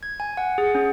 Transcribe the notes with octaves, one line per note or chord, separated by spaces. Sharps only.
G#6
G#5
F#5
G#4
C#4